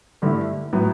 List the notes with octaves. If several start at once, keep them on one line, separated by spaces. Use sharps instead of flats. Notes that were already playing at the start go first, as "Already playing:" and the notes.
G2 D3 A3 E4
A2 F#3 B3